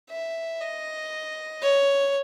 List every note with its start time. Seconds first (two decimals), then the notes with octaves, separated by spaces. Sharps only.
0.10 E5
0.61 D#5
1.62 C#5